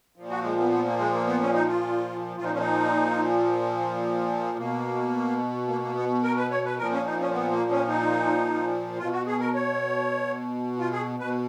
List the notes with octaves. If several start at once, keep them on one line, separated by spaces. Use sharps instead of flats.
A#2 F3
F#4
G#3
B3
B3
A#3
G#3
A#3
B3
C#4
D#4
F4
A#2 F3 D#4 F4
C#4
D#4
B2 A#3
A#3
A#3
B3
A#4
B4
C#5
B4
A#2 F3 A#4
C#4
D#4
C#4
B3
A#3
C#4
D#4
B2 F4
F#4
G#4
A#4
C#5
F4
G#4
B2 B4